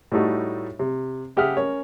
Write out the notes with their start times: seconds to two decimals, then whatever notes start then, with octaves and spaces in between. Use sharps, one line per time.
0.12 A2 G3 A3 D#4 F#4
0.79 C3
1.37 C#3 G4 E5 F#5 D#6 F6
1.57 C#4 A#4 C#5